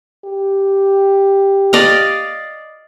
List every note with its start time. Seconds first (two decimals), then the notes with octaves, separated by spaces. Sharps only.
0.25 G4
1.73 D5 D#5 F5